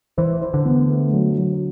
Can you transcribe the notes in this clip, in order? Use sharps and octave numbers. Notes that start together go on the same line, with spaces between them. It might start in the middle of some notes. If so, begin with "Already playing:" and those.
E3 C5
C5
D3
B3
A3
F#3
F#3